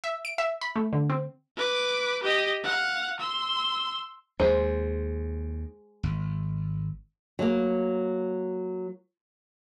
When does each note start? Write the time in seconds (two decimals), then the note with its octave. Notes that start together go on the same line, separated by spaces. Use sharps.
0.04 E5
0.25 D7
0.38 E5
0.61 B5
0.76 A3
0.93 D3
1.10 C4
1.56 B4 D6
2.23 G4 D#5
2.63 F5 F#5
3.19 C6 E6
4.40 D#2 G#3 G#4 C5
6.03 G#1
7.39 F#3 A#3